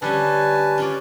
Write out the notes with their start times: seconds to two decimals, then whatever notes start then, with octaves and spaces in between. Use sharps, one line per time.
0.02 D3 G3 C#4 B4 G#5 A5
0.78 C#4 F4 D5